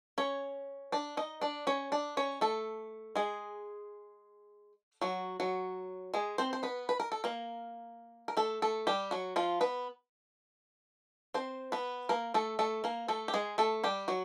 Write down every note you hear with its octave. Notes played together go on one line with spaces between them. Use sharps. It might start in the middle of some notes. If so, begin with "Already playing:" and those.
C#4 C#5
D4 D5
D#4 D#5
D4 D5
C#4 C#5
D4 D5
C#4 C#5
A3 A4
G#3 G#4
F#3 F#4
F#3 F#4
G#3 G#4
C4 C5
C5
B3 B4
B4
A#4
A4
A#3 A#4
A#4
A3 A4
A3 A4
G3 G4
F#3 F#4
F3 F4
B3 B4
C4 C5
B3 B4
A#3 A#4
A3 A4
A3 A4
A#3 A#4
A3 A4
G4
G#3 G#4
A3 A4
G3 G4
F#3 F#4